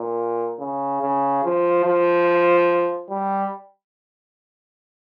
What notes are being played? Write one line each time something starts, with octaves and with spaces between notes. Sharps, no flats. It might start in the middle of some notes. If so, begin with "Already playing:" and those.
Already playing: A#2
C#3
C#3
F3
F3
G3